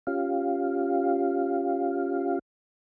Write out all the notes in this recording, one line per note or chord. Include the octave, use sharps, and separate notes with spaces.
C#4 F4 G4 F5